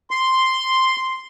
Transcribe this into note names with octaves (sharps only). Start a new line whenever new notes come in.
C6